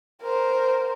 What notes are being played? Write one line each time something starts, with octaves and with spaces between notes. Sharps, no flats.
A#4 C5